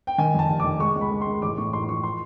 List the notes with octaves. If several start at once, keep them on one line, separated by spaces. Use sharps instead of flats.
G5
D#3 G#5
F2 A5
F1
D#3 D6
G#3 C#6
C#2
B5
G#3
C6
G#3
A1 D6
A2 C#6
A1 C6
C6
F3 C#6
C6